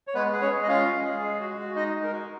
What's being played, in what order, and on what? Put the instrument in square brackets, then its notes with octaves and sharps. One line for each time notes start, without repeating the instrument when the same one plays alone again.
[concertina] C#5
G#3 B3 B4
G#4 B4
C#4 C#5
G#3
D#5
C#4 F4 F5
G#3
G#4
G#3
F#4
G#3
D#4 D#5
G#3
A#4
F#4